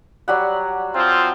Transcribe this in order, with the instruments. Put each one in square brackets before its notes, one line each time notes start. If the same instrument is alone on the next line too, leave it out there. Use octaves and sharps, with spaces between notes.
[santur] F#3 G3 F#5
[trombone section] F3 C4 F4